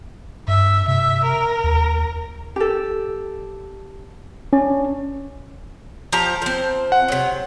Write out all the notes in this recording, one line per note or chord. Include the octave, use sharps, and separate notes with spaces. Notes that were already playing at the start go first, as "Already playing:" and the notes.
G2 E5
C3 E5
A#4
D#2
G4 A4
C#4 D4
F3 G4 A#5
F3 C4
F#5
C3 F#3